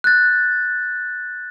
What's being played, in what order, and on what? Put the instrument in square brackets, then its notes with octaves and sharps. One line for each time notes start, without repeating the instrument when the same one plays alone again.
[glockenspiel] F#6 G6 A6